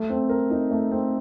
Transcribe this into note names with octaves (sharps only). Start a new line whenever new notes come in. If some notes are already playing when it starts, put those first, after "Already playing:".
Already playing: A3
C4
A#4
D#4
A3
C4